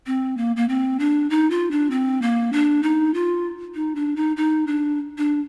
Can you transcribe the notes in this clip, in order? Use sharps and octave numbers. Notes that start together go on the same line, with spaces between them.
C4
A#3
A#3
C4
D4
D#4
F4
D4
C4
A#3
D4
D#4
F4
D#4
D4
D#4
D#4
D4
D4